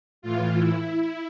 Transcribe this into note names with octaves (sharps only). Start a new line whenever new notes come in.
A2 E3 F4
E4